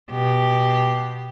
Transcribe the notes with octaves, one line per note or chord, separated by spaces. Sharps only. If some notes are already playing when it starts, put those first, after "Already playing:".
B2 G4